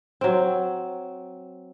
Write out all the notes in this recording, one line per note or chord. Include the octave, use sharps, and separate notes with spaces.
F#3 C4